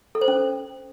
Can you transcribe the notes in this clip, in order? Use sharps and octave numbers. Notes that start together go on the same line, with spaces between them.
A4
C5
C#4